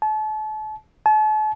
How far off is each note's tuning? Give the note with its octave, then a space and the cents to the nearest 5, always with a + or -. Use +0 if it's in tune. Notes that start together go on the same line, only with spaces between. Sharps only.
A5 -35
A5 -40